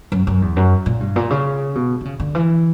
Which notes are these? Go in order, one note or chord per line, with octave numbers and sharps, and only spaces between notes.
F#2
F#2
E2
F#2
A#2
G2
A#2
C#3
B2
D3
C#3
D3
E3